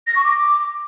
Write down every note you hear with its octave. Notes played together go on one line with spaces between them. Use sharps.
A#6
C#6
D6